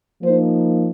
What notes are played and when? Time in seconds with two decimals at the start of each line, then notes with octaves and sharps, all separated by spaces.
0.21 F3 A#3 D#4 C5